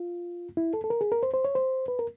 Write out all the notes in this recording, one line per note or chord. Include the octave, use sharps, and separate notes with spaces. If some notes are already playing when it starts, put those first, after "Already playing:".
Already playing: F4
E4
A4
A4
A#4
G#4
A#4
C5
C5
C#5
C5
B4
A#4